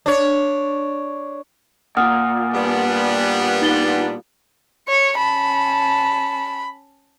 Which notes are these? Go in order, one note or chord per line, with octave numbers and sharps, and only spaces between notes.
D4 C#5
A#2 F#5 D#6 F6
G3 B3 D4
D#4 A6 G7
C#5 C#7
C#4 A5 B5